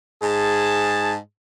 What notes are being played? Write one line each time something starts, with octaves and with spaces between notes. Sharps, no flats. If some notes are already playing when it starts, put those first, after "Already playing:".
G#2 G#4 A5